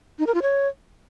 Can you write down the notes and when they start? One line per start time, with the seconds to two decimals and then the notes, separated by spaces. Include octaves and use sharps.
0.19 D#4
0.27 A#4
0.34 F4
0.42 C#5